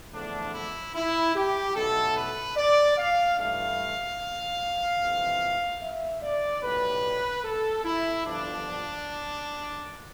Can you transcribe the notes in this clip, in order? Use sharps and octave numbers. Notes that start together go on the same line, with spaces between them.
E2 D3 F3 A3 D4
E4
E4
G4
B1 B2 A3 A4
B4
D5
F5
G2 E3 A3 F5
F2 C3 E3
E5
D5
B1 A2 G3 B4
A4
E4
G1 F2 D3 F3 D4